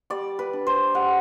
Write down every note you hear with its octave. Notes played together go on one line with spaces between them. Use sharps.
G3 D5
B4
D4
C5
G3 F#5